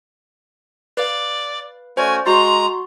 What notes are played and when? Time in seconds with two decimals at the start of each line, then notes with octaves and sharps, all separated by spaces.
0.97 B4 D5 F5
1.97 A3 C#4 F#4 C5 D5 G#5
2.26 G#3 F#4 A#5 C6 A6